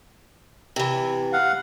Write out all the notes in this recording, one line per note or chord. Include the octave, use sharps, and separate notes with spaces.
C3 E3
F5 F#5